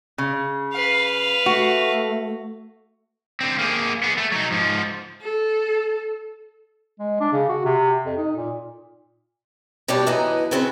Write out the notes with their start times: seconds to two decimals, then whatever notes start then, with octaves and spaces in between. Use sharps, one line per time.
0.18 C#3
0.72 B4 F5
1.46 A3 F#4
3.41 D3 C4
3.59 A#3 G#4
4.03 B3 G#4
4.17 A3
4.32 F#3 D#4
4.51 G#2 F3
5.21 A4
7.00 G#3
7.20 D4
7.33 C#3
7.49 F#4
7.65 C3
8.06 F2
8.18 D#4
8.36 A#2
9.88 B2 G3 D4 G4 C#5 D5
10.06 F#2 E3 B3 D#4
10.51 C#3 B3 C4 F#4 B4